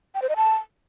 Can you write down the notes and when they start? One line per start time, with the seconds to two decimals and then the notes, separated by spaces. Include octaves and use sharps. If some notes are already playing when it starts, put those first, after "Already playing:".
0.15 G5
0.22 C5
0.29 D#5
0.36 A5